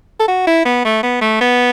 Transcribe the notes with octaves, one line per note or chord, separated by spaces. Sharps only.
A4
F#4
E4
B3
A3
B3
A3
B3